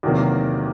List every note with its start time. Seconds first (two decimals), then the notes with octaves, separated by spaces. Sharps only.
0.03 E2 C3 D#3 F#3 A#3